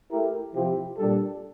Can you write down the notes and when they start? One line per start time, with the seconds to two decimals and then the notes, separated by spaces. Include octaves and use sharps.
0.11 A3 E4 G4 A#4
0.54 C3 F3 C4 E4 G4
0.98 A#2 G3 D4 A4